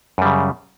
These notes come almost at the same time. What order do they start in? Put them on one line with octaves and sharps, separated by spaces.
F#2 G3 C#3